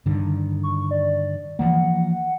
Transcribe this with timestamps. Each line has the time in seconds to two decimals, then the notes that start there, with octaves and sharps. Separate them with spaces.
0.06 G2 D3 D#3
0.63 C#6
0.91 D5
1.59 E3 F3 A#3 F#5